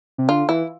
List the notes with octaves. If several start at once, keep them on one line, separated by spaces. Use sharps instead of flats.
C3
D3 F4
E3 E4